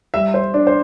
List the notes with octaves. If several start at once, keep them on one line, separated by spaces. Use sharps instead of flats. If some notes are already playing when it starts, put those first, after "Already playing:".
G3 E5
C5
D4
C5